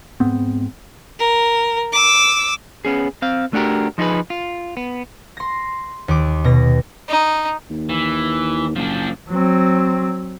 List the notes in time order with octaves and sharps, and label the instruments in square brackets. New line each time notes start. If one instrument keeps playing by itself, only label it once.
[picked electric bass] G#2 B3 C4
[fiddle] A#4
D6 E6
[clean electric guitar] B3 C#4 G#4
C4 F5
A3 D4 F#4 G4 A#4
F3 D#4 E4 G#4 B4
F4
B3
[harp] C6 A#6
D#2 D6
B2 A#6
[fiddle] D#4
[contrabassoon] D#2
[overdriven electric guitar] E3
[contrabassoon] F#1 [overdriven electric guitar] F3 D4
[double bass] F#3 C4